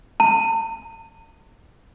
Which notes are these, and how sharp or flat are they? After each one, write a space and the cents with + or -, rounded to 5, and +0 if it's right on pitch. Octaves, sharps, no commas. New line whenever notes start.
A5 +45